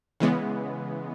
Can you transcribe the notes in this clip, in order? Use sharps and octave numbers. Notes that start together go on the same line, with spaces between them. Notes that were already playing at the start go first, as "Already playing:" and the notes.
C#3 E3 G#3 B3